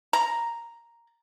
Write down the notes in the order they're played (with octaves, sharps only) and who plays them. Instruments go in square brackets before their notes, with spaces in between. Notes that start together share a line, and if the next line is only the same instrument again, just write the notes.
[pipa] A#5